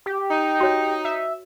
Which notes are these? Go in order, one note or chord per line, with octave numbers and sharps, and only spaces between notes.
G4
D#4
F#4 C#5
E5